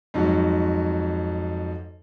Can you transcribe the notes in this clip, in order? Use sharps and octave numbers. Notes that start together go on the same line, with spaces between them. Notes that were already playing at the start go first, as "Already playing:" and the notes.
F2 G#2 F#3